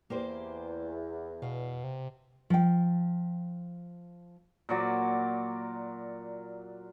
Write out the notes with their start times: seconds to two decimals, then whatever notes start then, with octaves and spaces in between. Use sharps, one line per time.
0.10 E2 A#3 G4 C5
1.42 B2 F5
1.84 C3
2.50 F3 G5
4.69 A#2 F#3 D5